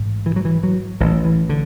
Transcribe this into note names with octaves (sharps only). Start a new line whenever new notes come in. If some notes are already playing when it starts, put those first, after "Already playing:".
Already playing: A1 G#2
E3
F#3
E3
F#3
A1 A2 E3
E3
D3